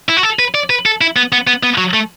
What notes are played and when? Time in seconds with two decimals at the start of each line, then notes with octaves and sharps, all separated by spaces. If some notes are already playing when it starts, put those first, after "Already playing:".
0.09 E4
0.17 F#4
0.23 A4
0.39 B4
0.54 D5
0.70 B4
0.86 A4
1.01 E4
1.16 B3
1.32 B3
1.47 B3
1.63 B3
1.78 F#3
1.94 A3